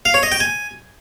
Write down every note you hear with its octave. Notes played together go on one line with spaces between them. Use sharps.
F5
C#5
D#5
G5
G#5